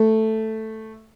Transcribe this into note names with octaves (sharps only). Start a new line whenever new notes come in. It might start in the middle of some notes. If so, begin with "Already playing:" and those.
Already playing: A3